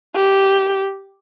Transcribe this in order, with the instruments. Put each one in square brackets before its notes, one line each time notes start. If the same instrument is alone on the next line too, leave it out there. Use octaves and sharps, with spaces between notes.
[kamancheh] G4